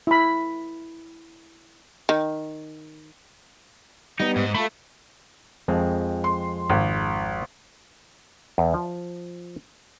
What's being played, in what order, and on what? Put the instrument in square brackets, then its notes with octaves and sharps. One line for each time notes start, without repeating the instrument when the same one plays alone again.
[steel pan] E4 B5
[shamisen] D#3
[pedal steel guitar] G3 B3 [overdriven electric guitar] D#4
[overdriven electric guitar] G#2
[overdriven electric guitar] A3 [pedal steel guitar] F4 A4 B5
[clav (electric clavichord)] F2 G#3 C4
[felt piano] C6
G#1
[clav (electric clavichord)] E2
F3